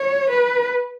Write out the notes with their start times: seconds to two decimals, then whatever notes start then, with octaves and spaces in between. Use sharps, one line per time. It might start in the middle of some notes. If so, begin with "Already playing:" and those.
Already playing: C#5
0.29 B4